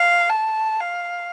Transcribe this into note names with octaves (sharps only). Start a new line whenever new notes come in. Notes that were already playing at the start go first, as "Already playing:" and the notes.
Already playing: F5
A5
F5